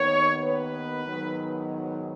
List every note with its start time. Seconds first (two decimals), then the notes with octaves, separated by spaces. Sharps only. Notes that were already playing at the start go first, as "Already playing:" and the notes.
Already playing: D#2 D#3 B3 C#5
0.43 B4
1.07 G#2 D#3 F#3 B3